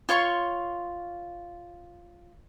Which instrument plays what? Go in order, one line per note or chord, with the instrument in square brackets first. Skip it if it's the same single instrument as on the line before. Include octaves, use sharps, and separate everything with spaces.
[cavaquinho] F4 C#5 C6 C#6